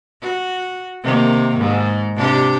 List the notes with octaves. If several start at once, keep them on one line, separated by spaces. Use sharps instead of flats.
F#4
C3 D#3 A#3
G#2
C3 D4 G4